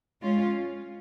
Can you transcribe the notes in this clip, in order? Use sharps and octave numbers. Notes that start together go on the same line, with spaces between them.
G#3 C#4 F4